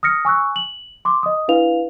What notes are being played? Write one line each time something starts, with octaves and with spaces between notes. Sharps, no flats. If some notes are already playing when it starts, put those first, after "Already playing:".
D#6 F6 A#6 C#7
G#5 C#6 E6 F#6
F#7
C6 D6
D#5 D#6
D4 E4 B4 F5 F7